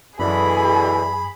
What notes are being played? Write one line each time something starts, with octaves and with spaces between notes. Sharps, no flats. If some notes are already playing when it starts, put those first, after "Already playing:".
F#2 B2 D3 E3 G#4 B5